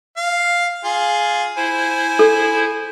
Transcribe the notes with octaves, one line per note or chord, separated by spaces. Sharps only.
F5
F4 G#4
E4 C5 G#5
A4